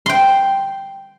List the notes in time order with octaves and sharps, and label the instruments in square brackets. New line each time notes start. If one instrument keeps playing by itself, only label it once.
[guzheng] G5 C6